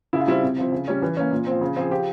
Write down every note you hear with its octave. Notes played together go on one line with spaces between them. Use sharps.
C#3 E4
F4
G3 C4 E4
C3
F3 C4
C#3
G3 C#4
E3
A#3 C#4
A#2
F3 C4
C#3
F3 C4 G#4
F3 G4